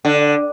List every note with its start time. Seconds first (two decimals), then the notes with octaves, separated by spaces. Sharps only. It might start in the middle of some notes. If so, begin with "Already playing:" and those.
0.05 D3